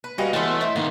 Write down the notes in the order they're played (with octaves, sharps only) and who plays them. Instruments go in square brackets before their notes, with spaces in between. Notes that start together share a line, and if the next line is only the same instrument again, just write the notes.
[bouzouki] B4
[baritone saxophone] G3 [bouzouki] C#4 B4 [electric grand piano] F#4 D#5 F5
[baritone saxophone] E3 [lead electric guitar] A3 [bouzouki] B3 C#4 F#4 [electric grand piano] D#5 C6
[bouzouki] E4 C5
[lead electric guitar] A2 D#3 [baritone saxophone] A#3 [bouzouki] F#5